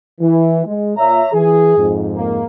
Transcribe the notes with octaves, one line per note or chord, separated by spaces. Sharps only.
E3
G#3
A#2 C#5 E5 A#5
E3 G#4
F2 G#2
A#3